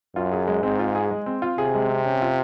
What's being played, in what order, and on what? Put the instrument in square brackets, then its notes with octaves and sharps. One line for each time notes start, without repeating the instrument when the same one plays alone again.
[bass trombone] F#2 [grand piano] F4
[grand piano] G#4
G#3
[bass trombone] G#2 [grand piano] C4
[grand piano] F4
G#4
G#3
C4
F4
[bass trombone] C3 [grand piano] G#4
[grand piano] G#3
C4
C#4
F4